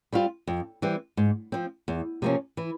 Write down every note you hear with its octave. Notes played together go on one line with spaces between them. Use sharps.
G3 C4 F4
F2
E3 G3 C4
G#2
F3 C4
E2
C3 F3 A#3 C#4
E3